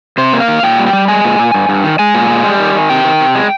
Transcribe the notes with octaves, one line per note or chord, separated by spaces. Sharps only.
C3 C5
A#3
F5
D#3
A#2 G5
G3
G5
G3
G#3 G#5
A#2
A#2
G2
G2
D#3
G#3 G#5
A#2
G#3
G3
D#3
D#3
C3 G5
D#3
C3
G#3